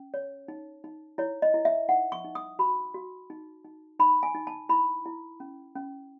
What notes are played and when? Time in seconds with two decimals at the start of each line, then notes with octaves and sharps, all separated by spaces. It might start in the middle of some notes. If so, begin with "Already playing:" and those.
Already playing: C#4
0.14 C#5
0.48 D#4
0.84 D#4
1.18 E4 C#5
1.42 D#5
1.54 E4
1.65 E5
1.89 D#4 F#5
2.12 C#6
2.25 D#4
2.35 D#6
2.59 F#4 B5
2.94 F#4
3.30 D#4
3.65 D#4
4.00 D#4 B5
4.23 G#5
4.35 D#4
4.47 A5
4.69 E4 B5
5.06 E4
5.40 C#4
5.76 C#4